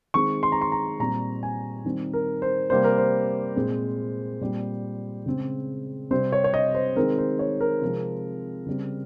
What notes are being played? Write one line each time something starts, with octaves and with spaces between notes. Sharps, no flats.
D#3 G#3 C4 C#6
C6
A#5
C6
A#5
A#2 G3 C4 A#5
G#5
D#3 G3 C4
A#4
C5
C3 G3 A#3 C5
A#4
C5
A#2 G#3 C4
A#2 G3 C4
C#3 G#3 C4
C3 G3 C4 C5
C#5
C#5
D#5
C5
D#3 G#3 C4 A#4
C5
C#5
A#4
C3 F3 G#3 C4
C#3 G3 C4